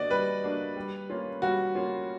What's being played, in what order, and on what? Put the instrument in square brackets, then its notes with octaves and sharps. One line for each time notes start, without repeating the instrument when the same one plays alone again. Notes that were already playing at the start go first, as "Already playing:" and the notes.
Already playing: [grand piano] A#3 D4 F#4 [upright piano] D5 D#5
[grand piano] G3 [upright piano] B4
[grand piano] A#3 D4 F#4
G3
A#3 C#4 F4
[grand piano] G3 [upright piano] F#4
[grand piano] A#3 C#4 F4